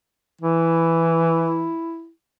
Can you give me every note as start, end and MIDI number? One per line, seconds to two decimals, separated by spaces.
0.41 1.73 52
0.41 2.10 64